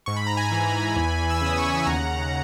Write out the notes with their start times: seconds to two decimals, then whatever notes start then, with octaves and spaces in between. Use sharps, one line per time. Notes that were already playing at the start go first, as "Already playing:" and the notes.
0.06 G#2 C#6
0.16 B5
0.27 A#5
0.37 G#5 B5
0.52 E3
0.96 E2
1.30 E6
1.41 C#3 D#6
1.58 C#6
1.72 B5
1.86 D#2 F#5 A#5